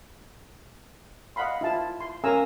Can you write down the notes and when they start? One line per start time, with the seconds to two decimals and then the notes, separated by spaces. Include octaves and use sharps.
1.36 D#5 F5 F#5 B5 C6
1.61 E4 F4 A5
2.00 C6
2.24 C#4 A#4 F5 G#5 A#5 E6